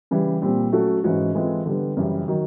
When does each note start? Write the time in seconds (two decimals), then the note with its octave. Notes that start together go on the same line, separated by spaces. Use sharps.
0.11 C#3 E3 G3
0.42 A#2 G3 C4
0.72 F#3 A3 C#4 F#4 A4
1.04 G#2 E3 G#3 C#4 F#4
1.35 E3 G#3 C4 F4 A4
1.66 D3 G3 B3
1.97 F#2 C#3 E3 G3
2.28 D#3 F#3